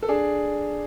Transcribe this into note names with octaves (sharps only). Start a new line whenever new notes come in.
A4
D4 G#4